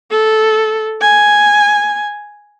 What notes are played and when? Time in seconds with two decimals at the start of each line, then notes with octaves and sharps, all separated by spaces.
0.11 A4
1.01 G#5